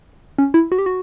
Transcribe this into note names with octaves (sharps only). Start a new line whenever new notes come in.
C#4
E4
F#4
G4
F#4